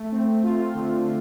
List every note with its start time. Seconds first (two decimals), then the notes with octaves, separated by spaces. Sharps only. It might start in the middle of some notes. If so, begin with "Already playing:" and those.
Already playing: A3
0.12 C4
0.44 F4
0.74 D3